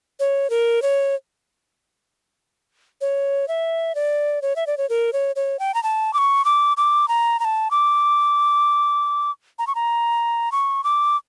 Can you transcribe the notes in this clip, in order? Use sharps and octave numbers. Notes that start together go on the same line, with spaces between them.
C#5
A#4
C#5
C#5
E5
D5
C#5
E5
D5
C#5
A#4
C#5
C#5
G5
A#5
A5
D6
C#6
D6
D6
A#5
A#5
A5
D6
A#5
C#6
A#5
C#6
D6